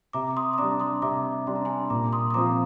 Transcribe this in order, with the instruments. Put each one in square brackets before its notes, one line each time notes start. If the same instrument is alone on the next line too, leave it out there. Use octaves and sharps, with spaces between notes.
[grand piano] C3 [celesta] A#5 D6
[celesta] C6 D#6
D#6
[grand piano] G3 D4 [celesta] A#5 D6
[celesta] C6 D#6
[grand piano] C3 [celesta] A#5 D6
[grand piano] G3 D4 [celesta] C6
[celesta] A#5
G#5 C6
[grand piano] A#2 [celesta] A#5 D6
[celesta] C6 D#6
D#6
[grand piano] F3 C4 F4 [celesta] A#5 D6